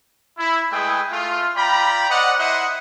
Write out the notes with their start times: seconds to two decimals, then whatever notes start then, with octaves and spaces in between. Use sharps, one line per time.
0.38 E4
0.71 G#3 A3 E4 G#4 B4 G5
1.12 A3 F4
1.56 F4 D5 G5 A#5 B5
2.09 C5 D5 D#5 F#5
2.39 E4 C5 D#5 E5 F#5